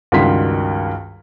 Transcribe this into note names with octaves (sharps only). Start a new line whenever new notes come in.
C#2 G2 D#3 F#4 C6 B6